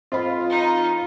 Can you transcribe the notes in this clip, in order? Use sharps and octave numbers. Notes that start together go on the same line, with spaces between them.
F2 F4 C5 D#5 B5
D#4